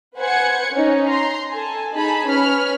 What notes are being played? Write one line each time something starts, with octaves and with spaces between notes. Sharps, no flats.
B4 C5 F#5 G#5 G#6 C#7
C#4 D#4
A#5 C6
A4 G#5 A5
D#4 G#4 A5 B5
C#4 B4 B5 F6